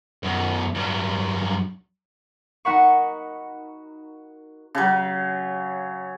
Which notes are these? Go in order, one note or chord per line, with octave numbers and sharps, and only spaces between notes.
F#2 B2
G2 F#3
D#4 F#4 A#4 F#5 B5 C#6
C#3 F#3